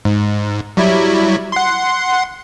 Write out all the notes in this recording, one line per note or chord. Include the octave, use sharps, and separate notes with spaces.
G#2
F#3 G3 E4
F#5 C6